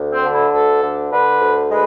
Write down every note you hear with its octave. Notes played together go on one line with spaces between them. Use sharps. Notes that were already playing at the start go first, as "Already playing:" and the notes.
Already playing: D2
C4
D3
E4
D2 A4
D3
D3 B4
D2
G#3 B4